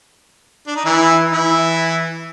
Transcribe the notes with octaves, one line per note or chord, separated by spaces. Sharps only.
D4
D#4
E3 E4
E3 E4